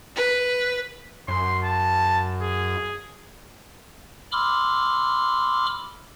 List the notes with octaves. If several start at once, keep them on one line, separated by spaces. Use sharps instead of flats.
B4
F#2 C6
A5
G#4
B5 C6 D6 E6 F6